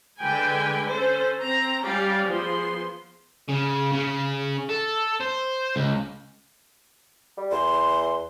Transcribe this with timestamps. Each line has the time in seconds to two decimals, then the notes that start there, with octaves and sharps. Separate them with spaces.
0.20 D3 G#3 B4 G5 G#5
0.89 C#4 A4 C5
1.40 C4 A#5
1.83 G3 C#4 G4 D5 F5
2.27 F3 B3 G#4 C6
3.49 C#3
3.92 C#3
4.69 A4
5.20 C5
5.76 C#2
7.37 G3
7.52 E2 C6